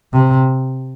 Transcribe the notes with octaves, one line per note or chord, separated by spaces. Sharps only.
C3